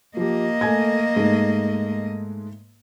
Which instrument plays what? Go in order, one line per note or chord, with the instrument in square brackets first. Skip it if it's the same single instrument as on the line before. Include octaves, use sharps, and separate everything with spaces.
[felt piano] F3 G4 [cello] A#3 D#5
[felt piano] A3 G#5 G#6
G#2 G#3 A3